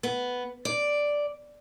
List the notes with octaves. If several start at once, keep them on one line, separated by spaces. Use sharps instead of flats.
B3
D5